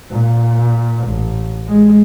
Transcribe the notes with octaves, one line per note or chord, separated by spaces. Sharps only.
A#2
A1
G#3